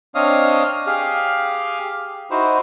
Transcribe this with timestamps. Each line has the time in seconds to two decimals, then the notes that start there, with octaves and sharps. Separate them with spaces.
0.15 C4 D4 C#5 D#5 F5 D#6
0.86 G4 G#4 F5
2.31 D#4 E4 F#4 C5